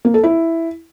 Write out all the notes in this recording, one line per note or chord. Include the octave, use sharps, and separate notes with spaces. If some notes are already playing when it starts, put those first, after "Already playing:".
A#3
A4
E4